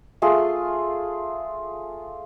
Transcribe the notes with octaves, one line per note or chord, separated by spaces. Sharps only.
A3 F4 G#4